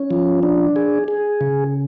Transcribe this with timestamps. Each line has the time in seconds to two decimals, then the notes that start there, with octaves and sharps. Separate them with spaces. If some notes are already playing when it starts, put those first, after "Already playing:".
Already playing: C#4
0.11 F3
0.43 D4
0.76 G#4
1.08 G#4
1.41 C#3